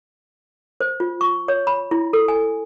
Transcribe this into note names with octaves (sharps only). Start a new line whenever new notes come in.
C5
F4
C#6
C#5
B5
E4
A4
G#5